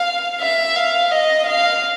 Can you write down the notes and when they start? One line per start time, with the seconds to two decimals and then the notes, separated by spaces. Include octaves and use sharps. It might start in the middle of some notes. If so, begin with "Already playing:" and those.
Already playing: F5
0.41 E5
0.76 F5
1.11 D#5
1.46 F5